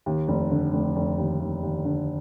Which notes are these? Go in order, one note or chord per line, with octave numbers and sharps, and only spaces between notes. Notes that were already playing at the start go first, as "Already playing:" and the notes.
D#2
F1
D3
F1
F1
D#2
D#2
D#2
D3